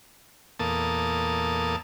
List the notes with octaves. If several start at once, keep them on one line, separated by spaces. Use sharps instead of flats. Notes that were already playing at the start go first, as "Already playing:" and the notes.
E2 A#2 A#3 A4 A5 D#6